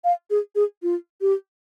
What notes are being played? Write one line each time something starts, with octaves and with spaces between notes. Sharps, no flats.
F5
G#4
G#4
F4
G4